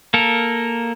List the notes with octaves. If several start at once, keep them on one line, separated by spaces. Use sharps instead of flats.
A#3 A4 A#4